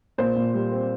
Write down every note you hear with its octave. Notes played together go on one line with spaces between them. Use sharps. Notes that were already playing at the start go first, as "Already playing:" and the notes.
A#2 C5
A#2
G3
C4